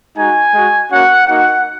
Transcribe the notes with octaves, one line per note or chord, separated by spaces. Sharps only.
G#3 D#4 F#4 G#5
G#3 F#4
A#3 C#4 F#4 F#5
A#3 D#4 F#4 F#5